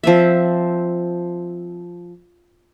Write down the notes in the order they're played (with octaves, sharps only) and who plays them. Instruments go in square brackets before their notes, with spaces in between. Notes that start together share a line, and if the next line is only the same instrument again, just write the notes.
[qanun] F3 C4 E5